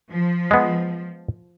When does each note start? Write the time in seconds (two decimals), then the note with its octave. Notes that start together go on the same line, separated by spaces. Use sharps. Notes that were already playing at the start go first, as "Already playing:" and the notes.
0.10 F3
0.51 G#3 B3